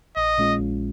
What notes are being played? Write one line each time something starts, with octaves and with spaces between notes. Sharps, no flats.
A#1 D#5
A#2 G#3 C#4 F4
A#1